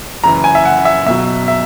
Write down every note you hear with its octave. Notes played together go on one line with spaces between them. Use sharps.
F#1 F#2 E3 A#5
G#5
E5
F#5
E5
B1 B2 F#3 E5
E5